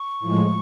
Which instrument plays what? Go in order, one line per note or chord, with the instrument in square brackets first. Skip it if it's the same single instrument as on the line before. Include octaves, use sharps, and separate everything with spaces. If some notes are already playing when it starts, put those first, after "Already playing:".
Already playing: [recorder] C#6
[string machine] A2 F3 G#3